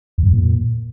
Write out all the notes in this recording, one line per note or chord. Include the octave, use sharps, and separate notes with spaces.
E2
G2
F2
A#2